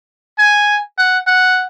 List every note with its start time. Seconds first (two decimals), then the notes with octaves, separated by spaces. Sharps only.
0.39 G#5
0.98 F#5
1.27 F#5